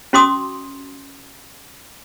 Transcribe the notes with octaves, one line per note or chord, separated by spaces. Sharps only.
C#4 F#4 C6 D6 D#6